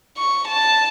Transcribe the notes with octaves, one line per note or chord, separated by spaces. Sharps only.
C#6
A5